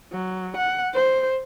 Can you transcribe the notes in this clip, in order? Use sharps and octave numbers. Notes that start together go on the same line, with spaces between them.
F#3
F#5
C5